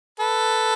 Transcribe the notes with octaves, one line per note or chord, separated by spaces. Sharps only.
A4 B4